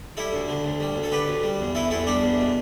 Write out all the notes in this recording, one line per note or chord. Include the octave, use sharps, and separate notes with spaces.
G3 E4 A4
D2
D3
D2
G3
D2
A4
D3 G4 B4
D2
G3
E2
E3 E4 A4
E2 E4 A4
G3 D4 G4
E2
B2